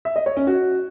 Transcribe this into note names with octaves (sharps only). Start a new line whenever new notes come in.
E5
D#5
C#5
C#4
F#4